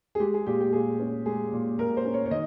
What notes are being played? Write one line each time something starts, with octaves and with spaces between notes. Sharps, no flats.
G#4
G#3 G4
G#4
A#2 G4
G4
A#2 G#4
C#4
G#3 G#4
A#2
A#2 A#4
C5
C#4
C#5
C#5
D#3 D#5